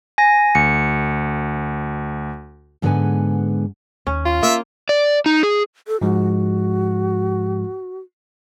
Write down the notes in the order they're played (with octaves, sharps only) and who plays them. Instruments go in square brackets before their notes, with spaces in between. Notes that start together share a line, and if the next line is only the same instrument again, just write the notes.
[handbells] G#5 A#6
[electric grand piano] D2 [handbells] C#7
[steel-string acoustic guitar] G#2 D3 G#3 B3 B4 G#5
[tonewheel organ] D#2 [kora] C#4
[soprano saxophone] F4
[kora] A#3 [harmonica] E5
[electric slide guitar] D5
D#4
G#4
[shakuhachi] A4
[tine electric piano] G#2 F3 G#3 [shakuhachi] F#4